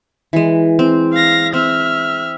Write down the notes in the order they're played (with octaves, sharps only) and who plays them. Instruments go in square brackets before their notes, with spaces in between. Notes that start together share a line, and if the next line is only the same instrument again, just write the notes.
[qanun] E3 G#3
C4
[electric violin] F5 A#6
[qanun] C4 [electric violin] E5 F6